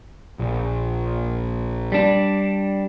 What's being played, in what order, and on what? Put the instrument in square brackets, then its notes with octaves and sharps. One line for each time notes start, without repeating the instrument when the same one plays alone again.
[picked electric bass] A#1
[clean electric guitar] G3 D4